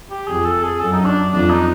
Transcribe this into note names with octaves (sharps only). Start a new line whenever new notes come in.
G4
F2 G#4
A4
G#4
F#2 A4
D#4
D4
F2 D4
D#4